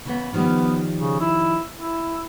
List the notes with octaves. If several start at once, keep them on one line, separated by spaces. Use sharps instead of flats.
C#3 E3 B3
D#3 F3 G3 B3
C#3
E4
E4